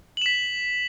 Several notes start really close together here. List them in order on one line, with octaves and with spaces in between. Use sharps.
F#7 E7 B6